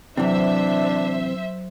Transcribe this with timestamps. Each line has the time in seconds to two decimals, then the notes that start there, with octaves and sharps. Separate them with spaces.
0.17 C3 E3 F#3 D4 C5 E5